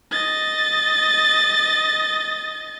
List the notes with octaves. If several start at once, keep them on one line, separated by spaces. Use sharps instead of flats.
D#5 A6